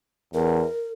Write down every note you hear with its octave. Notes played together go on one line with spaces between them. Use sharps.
E2 A#4